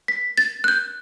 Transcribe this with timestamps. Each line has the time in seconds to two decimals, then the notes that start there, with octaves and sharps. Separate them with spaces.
0.08 B6
0.38 A6
0.64 F#6
0.68 G6